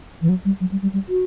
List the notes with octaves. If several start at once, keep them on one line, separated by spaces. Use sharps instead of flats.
E3
F#3
G3
F#3
G3
G3
G3
F#4